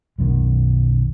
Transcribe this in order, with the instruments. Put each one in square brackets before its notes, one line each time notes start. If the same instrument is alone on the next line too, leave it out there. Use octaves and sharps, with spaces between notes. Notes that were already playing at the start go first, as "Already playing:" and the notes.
[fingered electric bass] B1 F#2 B2 D#3